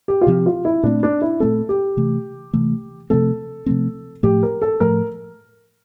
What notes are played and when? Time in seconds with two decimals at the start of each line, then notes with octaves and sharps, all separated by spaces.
0.08 G4
0.21 F4
0.27 C3 F3 C4 G4
0.46 F4
0.65 E4
0.83 A#2 A3 C4 D4
1.03 D4
1.22 E4
1.40 A#2 A3 C4 A4
1.69 G4
1.97 C3 E3 A3
2.53 C3 E3 A3
3.10 C3 F3 A3 C4 A4
3.66 C3 F3 A3 C4
4.23 A2 F3 A3 G4
4.43 A#4
4.62 A4
4.80 A2 F3 A3 A#4